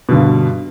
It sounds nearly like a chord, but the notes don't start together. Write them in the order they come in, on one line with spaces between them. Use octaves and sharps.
B2 D3 G2